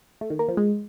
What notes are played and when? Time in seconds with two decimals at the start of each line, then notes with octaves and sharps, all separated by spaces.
0.21 A3
0.30 D#3
0.39 A#3
0.48 F3
0.57 G#3